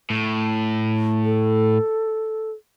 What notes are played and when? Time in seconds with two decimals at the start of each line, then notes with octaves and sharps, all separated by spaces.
0.10 A2
1.24 A4